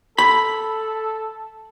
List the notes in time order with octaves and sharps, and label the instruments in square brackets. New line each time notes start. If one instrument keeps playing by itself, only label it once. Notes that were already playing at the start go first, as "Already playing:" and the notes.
[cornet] A4 [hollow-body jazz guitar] B5